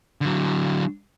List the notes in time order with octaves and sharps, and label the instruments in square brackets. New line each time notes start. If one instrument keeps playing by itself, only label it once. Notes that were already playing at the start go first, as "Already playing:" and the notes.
[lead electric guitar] D3 F#3